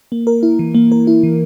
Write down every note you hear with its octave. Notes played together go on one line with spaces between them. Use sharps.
A#3
A#4
E4
E3
A#3
A#4
E4
E3